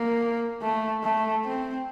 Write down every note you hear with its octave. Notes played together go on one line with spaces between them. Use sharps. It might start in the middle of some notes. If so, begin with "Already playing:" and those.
Already playing: A#3
A3
A3
C4